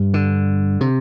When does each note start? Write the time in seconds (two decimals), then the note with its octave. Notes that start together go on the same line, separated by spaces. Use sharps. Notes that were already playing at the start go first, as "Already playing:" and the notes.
Already playing: G2
0.14 D3
0.81 C3